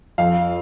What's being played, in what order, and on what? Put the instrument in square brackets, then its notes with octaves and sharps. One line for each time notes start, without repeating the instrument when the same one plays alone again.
[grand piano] F2 F5